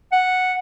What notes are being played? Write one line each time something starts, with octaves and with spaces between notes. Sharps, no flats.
F#5